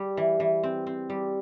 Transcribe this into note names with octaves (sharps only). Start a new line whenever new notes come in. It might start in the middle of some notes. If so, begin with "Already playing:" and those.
Already playing: G3
E3
E3
C4
C4
G3